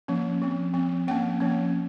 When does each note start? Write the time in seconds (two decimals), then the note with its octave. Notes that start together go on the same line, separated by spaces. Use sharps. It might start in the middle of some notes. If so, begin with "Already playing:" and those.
0.08 F3 A#3 C#4
0.42 F3 C4
0.74 F3 C4
1.08 F3 A#3 C#4 G5
1.40 F3 A#3 C#4